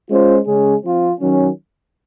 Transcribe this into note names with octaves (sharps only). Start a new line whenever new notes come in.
G#3 C#4 F4 C5
C#3 G#3 C#4 G#4
F3 C4 F4
D#3 F#3 C#4